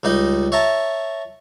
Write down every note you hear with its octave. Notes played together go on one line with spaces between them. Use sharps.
C#2 G3 D#4 D#5
C#5 E5 A5 A#5